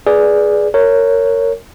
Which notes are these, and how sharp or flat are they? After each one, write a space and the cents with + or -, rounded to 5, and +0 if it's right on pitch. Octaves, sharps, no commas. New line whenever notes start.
G#4 +10 B4 -10 D5 +0
A#4 -20 C#5 +0